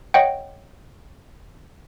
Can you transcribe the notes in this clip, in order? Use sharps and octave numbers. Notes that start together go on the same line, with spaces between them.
C#5 D#5 F#5 G5